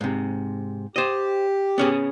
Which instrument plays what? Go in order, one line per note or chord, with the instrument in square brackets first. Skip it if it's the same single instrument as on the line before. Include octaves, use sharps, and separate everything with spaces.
[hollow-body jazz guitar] G#2 C3
[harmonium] G4 [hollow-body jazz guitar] C5 D#5
[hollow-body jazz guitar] B3 C#4 G#4